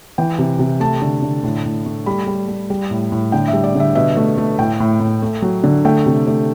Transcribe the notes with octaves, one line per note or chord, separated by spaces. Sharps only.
E3 G5
C3
C3
A3 A5
D3
D3
A2
A2
A3
G3 B5
G3
G3
G3
A2
A2
D3 G5
E5
G3
D5
D3 E5
B2 E5
A3
A3
A2 G5
A2
A2
A3
F#3
D3
A3 G5
C3
A3